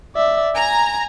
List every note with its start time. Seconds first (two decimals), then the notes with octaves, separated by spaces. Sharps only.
0.16 D5 E5
0.56 G#5 A#5